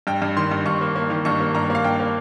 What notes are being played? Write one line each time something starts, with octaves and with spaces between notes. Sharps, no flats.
G2 G5
G2
D#3 C6
G2
G2 C#6
A#3
A#3
D#3
G2 C#6
A#3
G2 A#5
A#3 F5
G2 G5
A#3